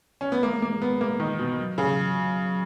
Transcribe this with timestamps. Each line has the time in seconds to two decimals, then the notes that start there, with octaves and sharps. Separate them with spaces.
0.21 C#4
0.32 B3
0.42 G#3 A#3
0.62 A#3
0.82 B3
1.01 A#3
1.20 D#3
1.39 B2
1.59 F#3
1.78 C#3